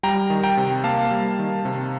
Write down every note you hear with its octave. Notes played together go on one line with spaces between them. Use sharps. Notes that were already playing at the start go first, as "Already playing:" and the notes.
G3 G5 A#5
D#3
G5 A#5
C3
A#3 F5 A5
G3
D#3
C3